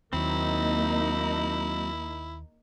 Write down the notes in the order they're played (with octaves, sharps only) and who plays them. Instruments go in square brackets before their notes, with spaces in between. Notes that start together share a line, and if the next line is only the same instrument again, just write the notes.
[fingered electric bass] D#2 [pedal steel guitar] F#3 C4 [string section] A#3 D#4 [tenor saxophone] E4